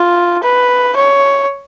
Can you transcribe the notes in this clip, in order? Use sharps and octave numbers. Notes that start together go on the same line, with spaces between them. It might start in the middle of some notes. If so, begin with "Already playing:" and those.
Already playing: F4
B4
C#5